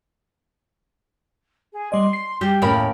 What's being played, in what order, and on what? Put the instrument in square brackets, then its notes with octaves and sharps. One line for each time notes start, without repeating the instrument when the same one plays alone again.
[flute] G#4
[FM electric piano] G3 D5 D#5 [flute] C6
[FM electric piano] C7
[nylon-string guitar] G3 [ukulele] G4 [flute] G5
[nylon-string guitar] D#2 A2 C#3 [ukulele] C#4 A#4 B5